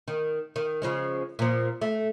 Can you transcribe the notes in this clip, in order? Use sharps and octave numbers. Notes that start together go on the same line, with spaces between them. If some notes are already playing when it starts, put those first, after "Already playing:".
D#3
D#3
C#3 F3 G#3
A#2 F3
A3